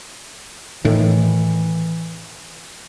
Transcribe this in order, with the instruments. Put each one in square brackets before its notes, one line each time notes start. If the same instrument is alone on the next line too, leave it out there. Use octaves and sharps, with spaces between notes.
[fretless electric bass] A2 D#3 [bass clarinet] E3